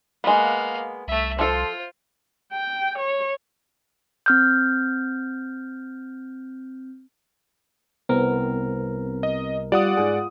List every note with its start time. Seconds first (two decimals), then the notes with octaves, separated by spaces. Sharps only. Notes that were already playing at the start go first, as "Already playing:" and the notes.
0.24 G#3 A#3 B3 F5
1.08 C2 A3 E5
1.39 F3 F4 A4 C5
2.53 G5
2.99 C#5
4.26 C4 F6 G6
8.09 C2 B3 C4 A#4
9.23 D#5
9.72 G3 F4 D5 F#5 D#6
9.97 G#2 G#4